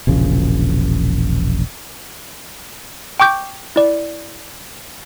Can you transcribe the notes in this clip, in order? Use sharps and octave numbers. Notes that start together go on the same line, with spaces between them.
E1 A#1 C#3
G5 C#6 D6 G6
E4 D5